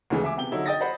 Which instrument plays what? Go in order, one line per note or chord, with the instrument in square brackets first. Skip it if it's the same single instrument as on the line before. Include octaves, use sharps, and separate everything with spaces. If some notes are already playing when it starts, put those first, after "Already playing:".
[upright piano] D2 C#3 E3 G#3
E5 G#5 D6
C3 B3 G5 G7
D3 F#3 D#4 E4
D#5 G5 D#6 A6 A#6
C5 D#5 F#5 B5